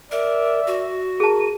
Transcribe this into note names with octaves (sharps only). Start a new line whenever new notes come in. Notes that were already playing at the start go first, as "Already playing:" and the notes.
A#4 D5 E5
F#4
G#4 A#4 A5 D#7